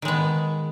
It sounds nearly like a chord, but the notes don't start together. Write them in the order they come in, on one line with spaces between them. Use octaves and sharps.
D#3 G#3 B3